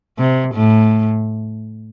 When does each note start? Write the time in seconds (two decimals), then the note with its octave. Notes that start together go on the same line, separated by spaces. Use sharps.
0.18 C3
0.54 A2